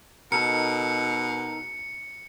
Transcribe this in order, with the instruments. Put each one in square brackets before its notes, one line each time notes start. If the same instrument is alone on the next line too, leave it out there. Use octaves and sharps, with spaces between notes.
[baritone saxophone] B2 [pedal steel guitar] D#4 A4 A#4 [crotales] C#7